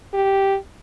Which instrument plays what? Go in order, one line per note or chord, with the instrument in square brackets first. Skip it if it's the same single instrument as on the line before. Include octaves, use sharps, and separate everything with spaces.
[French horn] G4